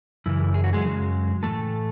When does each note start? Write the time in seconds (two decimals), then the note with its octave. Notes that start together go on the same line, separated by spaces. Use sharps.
0.26 F#2 C#3 E3 E4
0.54 G#4
0.64 F#4
0.73 G#3 G#4
0.84 F#2 C#3 F#3
1.43 A2 E3 A3 A4